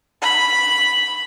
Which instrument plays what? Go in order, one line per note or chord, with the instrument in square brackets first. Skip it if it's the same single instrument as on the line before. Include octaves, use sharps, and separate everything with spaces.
[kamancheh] B5